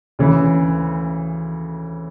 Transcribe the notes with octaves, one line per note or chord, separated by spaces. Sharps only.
D2 C#3 E3